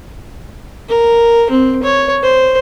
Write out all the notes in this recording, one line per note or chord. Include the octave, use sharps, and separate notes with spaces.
A#4
C4
C#5
C5